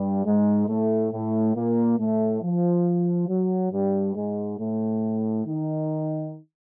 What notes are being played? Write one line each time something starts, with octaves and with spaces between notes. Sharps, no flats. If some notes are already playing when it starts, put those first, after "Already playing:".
Already playing: G2 G3
G#2 G#3
A2 A3
A2 A3
A#2 A#3
A2 A3
F3
F#3
G2 G3
G#2 G#3
A2 A3
D#3 D#4